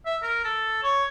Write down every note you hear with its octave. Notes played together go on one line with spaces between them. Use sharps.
E5
A#4
A4
C#5